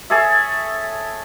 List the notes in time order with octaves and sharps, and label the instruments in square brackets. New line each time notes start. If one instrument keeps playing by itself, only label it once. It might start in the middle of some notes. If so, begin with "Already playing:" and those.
[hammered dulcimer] G#4 A4 C#5 E5